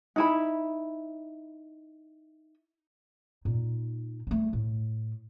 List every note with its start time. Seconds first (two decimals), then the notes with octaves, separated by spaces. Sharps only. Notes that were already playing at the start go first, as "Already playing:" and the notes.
0.16 D#4 E4 B5
3.45 A#2 D#4
4.27 G3 A3
4.53 A2